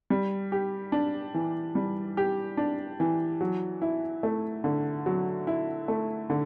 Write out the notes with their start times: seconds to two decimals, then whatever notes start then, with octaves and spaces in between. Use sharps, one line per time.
0.10 G3
0.52 G4
0.92 D4
1.34 E3
1.75 G3
2.17 G4
2.57 D4
3.00 E3
3.41 F#3
3.82 E4
4.23 A3
4.64 D3
5.06 F#3
5.47 E4
5.88 A3
6.30 D3